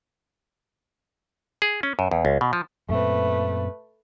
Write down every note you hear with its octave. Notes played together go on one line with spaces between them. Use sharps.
G#4
C#4
F#2
E2
C#2
B2
F3
F#2 A#2 A3 C4 B4